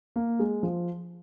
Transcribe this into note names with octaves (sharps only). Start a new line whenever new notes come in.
A#3
G#3
F3